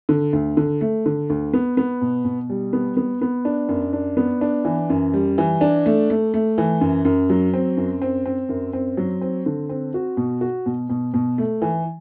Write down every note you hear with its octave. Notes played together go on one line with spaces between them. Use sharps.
D3
D2
D3
A3
D3
D2
B3
B3
B2
B2
G3
B3
B3
B3
D4
F#2
D4
B3
D4
E3
F#2
G3
E3
D4
A3
A3
A3
E3
F#2
F#2
F#3
C4
F#2
C4
C4
F#2
C4
F#3
C4
D3
C4
F#4
B2
F#4
B2
B2
B2
A3
E3